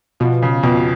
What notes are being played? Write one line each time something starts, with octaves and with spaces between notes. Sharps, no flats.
B2 F3
C#3
F2 B2